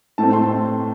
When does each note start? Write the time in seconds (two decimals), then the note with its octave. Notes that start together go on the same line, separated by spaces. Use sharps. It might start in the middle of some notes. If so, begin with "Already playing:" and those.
0.18 A2 A3 C4 A5
0.33 C6